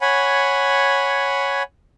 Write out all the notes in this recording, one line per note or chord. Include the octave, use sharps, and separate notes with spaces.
C#5 F#5 G#5 B5